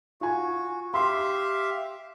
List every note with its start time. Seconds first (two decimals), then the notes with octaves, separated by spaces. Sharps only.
0.21 F4 F#4 G#5
0.94 G4 E5 F5 C6